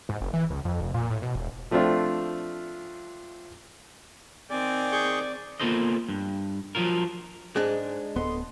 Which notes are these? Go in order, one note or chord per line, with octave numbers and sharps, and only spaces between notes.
G#2
F#1
E3
C#2
F2
F1
A#2
A2
B2
E1
F3 A3 C4 D4 F4
D#3 C4 D5 G5 G#5
G#4 C#6 G6
A#3 B3 F4 A4 C5 D#5
G2
F3 F#3 F4 A#4
G#2 G#3 D4 G#4
D1 B3 A4 D#5 C6